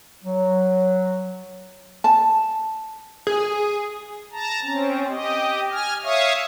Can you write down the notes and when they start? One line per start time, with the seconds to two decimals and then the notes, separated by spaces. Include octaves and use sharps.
0.24 F#3
2.04 A5
3.27 G#4
4.32 A5 A#5
4.62 C4 C#4
5.09 G4 D#5
5.71 G#5 F6
6.04 C#5 E5 F5 C#6 D#6